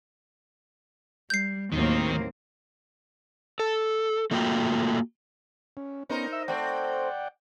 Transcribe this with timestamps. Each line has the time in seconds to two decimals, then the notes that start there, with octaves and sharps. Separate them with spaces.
1.30 G3 G6 C7
1.72 D#2 A2 D#3 F#3 A#3 C4
3.60 A4
4.31 A3 A#3 F4 F#4 D#5 G5
5.77 C#4
6.10 B3 C#4 D#4 A#4 C5
6.33 E5 E6
6.48 A3 C4 D5 F#5 G5